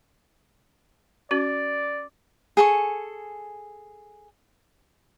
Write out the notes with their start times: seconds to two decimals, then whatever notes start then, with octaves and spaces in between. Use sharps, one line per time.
1.31 C#4 F#4 D5
2.57 G#4 A4 C#6